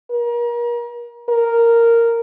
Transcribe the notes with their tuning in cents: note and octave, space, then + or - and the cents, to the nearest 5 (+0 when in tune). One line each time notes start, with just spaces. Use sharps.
A#4 +35
A#4 -5